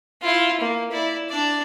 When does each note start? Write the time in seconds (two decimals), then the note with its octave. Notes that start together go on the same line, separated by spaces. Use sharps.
0.22 E4 F4
0.60 A#3
0.91 E4 D5
1.28 D4 D5